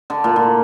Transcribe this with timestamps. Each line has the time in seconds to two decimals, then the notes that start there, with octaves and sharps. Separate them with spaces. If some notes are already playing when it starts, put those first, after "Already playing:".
0.10 D3
0.24 A#2
0.36 A#2